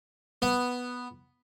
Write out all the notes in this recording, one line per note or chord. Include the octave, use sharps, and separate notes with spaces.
B3